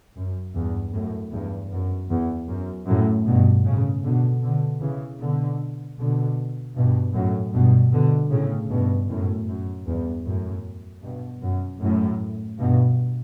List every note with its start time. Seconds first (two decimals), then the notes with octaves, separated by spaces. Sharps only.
0.16 F#2
0.55 E2 G2
0.93 F#2 A2
1.32 E2 G2
1.71 F#2
2.10 E2
2.48 F#2
2.87 F#2 A2
3.26 G2 B2
3.65 A2 C#3
4.04 B2 D3
4.43 B2 D3
4.81 C#3 E3
5.20 B2 D3
5.98 B2 D3
6.76 G2 B2
7.14 F#2 A2
7.53 G2 B2
7.92 B2 D3
8.31 A2 C#3
8.70 G2 B2
9.09 F#2 A2
9.47 F#2
9.87 E2 G2
10.25 F#2 A2
11.03 G2 B2
11.42 F#2
11.81 F#2 A2
12.58 G2 B2